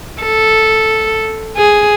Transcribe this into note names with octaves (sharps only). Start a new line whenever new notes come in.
A4
G#4